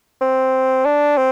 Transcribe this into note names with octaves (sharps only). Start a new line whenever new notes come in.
C4
D4
C4